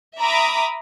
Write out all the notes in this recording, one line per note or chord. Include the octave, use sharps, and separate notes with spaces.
E5 A#5 B5 D6 D#6